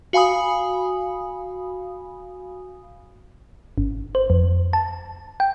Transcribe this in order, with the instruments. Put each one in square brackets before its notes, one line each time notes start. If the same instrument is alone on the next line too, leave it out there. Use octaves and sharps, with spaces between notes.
[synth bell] F#4 F5 G#5 B5 D#6
[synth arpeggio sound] G1
C5
F2
A5
G5